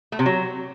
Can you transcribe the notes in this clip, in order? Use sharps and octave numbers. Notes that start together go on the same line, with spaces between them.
A3
C3
F#3